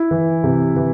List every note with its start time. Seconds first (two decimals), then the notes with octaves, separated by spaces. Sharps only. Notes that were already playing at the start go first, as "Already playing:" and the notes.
Already playing: E4
0.11 E3
0.44 C3
0.76 E3